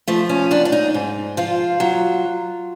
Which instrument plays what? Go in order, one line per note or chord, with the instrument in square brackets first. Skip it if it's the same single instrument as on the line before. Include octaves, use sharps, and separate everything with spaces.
[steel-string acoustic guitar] F3 A3
C#4
F#2 D4
D4
D#4
G#2
F3 F4
F#3